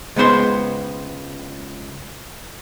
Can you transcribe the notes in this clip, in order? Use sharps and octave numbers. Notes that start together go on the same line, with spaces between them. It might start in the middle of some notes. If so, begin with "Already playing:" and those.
C#2 G#3 B3 C5 C6